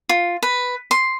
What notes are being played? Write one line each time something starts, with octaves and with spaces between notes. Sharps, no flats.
F4
B4
C6